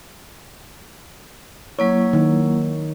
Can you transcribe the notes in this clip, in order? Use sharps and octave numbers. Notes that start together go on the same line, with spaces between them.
F#3 A#3 E4 C#5
D#3